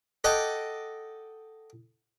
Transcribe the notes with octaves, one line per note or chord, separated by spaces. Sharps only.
A4 D#5 F#5 G5 D6 D#6